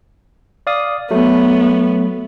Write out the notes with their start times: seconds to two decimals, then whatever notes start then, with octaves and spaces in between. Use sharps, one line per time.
0.67 D5 F5 D#6
1.11 F#3 A3 B3